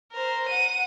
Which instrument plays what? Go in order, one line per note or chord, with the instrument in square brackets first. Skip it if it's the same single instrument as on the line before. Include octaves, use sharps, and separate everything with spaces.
[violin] A#4 C5
F#5 D#7